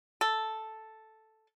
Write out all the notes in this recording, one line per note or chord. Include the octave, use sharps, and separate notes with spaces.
A4